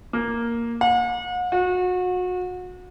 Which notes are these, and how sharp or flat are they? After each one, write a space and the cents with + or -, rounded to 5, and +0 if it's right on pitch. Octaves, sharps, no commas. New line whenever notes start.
A#3 +0
F#5 -40
F#4 -30